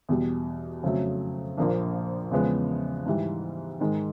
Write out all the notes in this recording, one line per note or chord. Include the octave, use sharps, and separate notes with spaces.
E2 B2 G3
F2 C#3 F#3 A3
A#1 A#2 F3 A#3 D4
E2 C#3 F3 G#3 B3
G#2 E3 G3
G#2 D#3 G#3